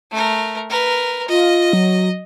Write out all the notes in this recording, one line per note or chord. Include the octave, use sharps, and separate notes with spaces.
A3 A#4
A#4 B4
F4 D#5
F#3